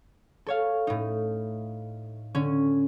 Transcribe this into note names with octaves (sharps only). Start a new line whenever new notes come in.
A4 C#5 F5
A2 D#4
D3 C#4